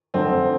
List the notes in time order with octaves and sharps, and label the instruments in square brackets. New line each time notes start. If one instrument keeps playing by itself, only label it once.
[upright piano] F1 F2 D3 C4